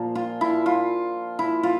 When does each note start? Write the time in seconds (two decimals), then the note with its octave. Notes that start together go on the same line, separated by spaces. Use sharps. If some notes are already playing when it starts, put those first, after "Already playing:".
Already playing: A#2 F3 A#3
0.15 F4
0.41 E4
0.66 F4
1.39 E4
1.63 F4